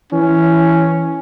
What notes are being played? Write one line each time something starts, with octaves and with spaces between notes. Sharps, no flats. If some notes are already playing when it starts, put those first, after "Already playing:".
E3 C#4